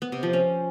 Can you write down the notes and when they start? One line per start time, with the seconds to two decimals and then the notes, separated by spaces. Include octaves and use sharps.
0.02 B3
0.12 C3
0.23 F3
0.33 C#4